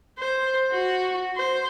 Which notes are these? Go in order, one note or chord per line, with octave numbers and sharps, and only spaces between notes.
C5
F#4
C5